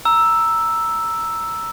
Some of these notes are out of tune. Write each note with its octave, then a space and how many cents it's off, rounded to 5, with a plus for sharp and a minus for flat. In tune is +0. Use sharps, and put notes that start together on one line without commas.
A#5 +0 E6 +0